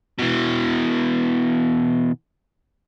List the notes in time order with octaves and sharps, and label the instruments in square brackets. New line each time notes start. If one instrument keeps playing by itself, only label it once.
[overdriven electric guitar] B2 E3